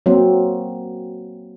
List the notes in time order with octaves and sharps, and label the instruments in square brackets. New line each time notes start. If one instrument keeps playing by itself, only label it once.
[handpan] F#3 A#3 C4